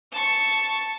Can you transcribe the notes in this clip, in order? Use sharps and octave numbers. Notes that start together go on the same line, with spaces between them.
A5 C#6